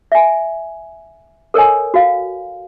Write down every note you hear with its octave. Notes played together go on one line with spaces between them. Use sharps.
E5 G#5
A4 A#4 C#5 D#5 G#5
F#4 F5